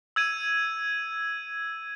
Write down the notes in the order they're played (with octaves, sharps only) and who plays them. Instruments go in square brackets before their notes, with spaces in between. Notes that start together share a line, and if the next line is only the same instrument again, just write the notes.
[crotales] E6 G#6 D#7